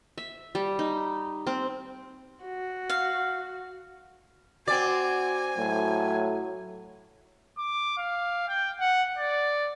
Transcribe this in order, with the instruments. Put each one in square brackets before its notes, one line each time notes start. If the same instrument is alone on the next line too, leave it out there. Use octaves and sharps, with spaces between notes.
[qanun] E5
G3
D#4
C4
[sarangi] F#4
[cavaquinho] F5
[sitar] C4 D5 [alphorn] F#4 [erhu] G#5
[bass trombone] A2 [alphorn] F#3
[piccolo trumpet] D6
F5
G5
F#5
D5